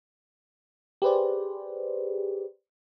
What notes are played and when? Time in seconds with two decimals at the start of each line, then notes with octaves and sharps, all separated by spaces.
1.02 G4 G#4 B4 C5 D5